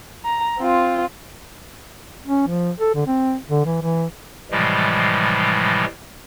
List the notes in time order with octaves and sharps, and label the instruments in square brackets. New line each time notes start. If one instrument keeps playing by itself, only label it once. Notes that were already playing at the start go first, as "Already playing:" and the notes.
[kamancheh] A#5
C4 F4
[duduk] C#4
F3
A4
D3
C4
D3
E3
E3
[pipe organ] A2 C3 E3 F3 G3 G#3